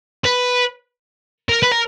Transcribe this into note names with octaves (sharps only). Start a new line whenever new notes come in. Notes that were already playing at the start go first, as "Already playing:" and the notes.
B4
A#4
B4
A#4